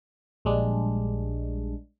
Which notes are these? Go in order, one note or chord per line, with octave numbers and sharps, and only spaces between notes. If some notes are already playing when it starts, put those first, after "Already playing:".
A#1 G3 G#3 D4